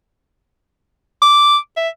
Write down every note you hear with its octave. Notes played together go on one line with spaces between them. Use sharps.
D6
E5